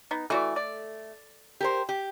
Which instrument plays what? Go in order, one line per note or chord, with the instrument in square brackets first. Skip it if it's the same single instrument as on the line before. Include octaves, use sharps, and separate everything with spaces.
[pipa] B3 D#4
[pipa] E3 F#4 D5 [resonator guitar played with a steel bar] A3
[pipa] D5
[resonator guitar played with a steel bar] G4 A#4 C5
G4